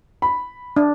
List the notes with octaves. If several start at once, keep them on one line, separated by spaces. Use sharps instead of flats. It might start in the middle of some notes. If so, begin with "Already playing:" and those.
B5
D4